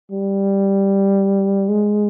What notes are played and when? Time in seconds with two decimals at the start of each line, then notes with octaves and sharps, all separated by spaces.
0.12 G3
1.69 G#3